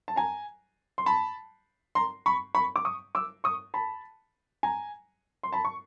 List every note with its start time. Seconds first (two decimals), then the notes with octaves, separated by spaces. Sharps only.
0.08 A5
0.16 G#5 A#5
0.98 C6
1.06 A5 B5
1.95 A#5 C6
2.26 B5 C#6
2.55 B5 C#6
2.76 D6
2.85 C#6 D#6
3.15 D6 E6
3.44 C#6 D#6
3.74 A5 B5
4.63 G#5 A#5
5.43 C6
5.53 A5 B5
5.65 C#6